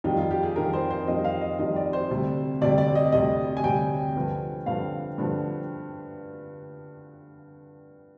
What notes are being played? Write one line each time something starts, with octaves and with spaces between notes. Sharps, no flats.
F2 D#3 G3 D#4
F4
G4
G#4
F2 D#3 G3 A#4
C5
C5
F2 D#3 G3 D#5
F5
D#5
F2 D#3 G3 D#5
D5
C5
D2 C3 G3
D2 C3 G3 D5
D5
D#5
D2 C3 G3 D#5
G#5
D2 C3 G3 G5
G2 D3 F3
G2 D3 F3 F5
G2 D3 F3